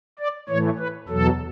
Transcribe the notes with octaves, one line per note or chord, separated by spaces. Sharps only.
D5
A2 E3 A3 C#5
B4
E2 B2 F#3 A4